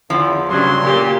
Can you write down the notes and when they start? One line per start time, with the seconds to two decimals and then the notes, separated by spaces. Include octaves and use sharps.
0.10 E2 F3
0.49 G2 C#3 F#3 C6
0.82 A#2 G4